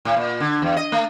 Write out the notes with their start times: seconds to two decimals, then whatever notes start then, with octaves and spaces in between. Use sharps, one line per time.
0.05 A2
0.17 A#2
0.40 D3
0.62 E2
0.77 D#5
0.92 A3